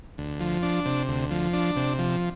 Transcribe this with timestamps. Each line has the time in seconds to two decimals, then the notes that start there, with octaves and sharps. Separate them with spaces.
0.18 D2
0.40 F3
0.63 D4
0.86 C3
1.08 D2
1.31 F3
1.53 D4
1.76 C3
1.99 F3